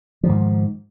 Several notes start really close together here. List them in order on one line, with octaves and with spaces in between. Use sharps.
F3 D#3 G#2